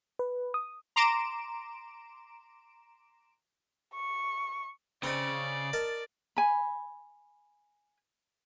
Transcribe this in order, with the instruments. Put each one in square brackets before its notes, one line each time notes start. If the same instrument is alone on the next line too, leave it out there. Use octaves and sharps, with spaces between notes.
[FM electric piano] B4
D#6
[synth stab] A#5 C6 D6 D7 E7
[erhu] C#6
[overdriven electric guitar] C#3 [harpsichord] C4 D#4 [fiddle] D5
[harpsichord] A#4 D#5 A5
[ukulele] G#5 B5